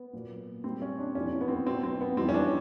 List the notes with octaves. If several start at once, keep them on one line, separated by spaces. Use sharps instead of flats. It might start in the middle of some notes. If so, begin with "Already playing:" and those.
Already playing: B3
A#2 F#3
A#2 G3 C4
C#4
D4
F2 C3 E3 C#4
B3
C4
B3
B2 F#3 C4
C4
B3
F2 C3 E3 G3 C4
C#4
D4